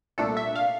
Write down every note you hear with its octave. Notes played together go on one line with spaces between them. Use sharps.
C2 A#2 A3 D4 A4
E5
F5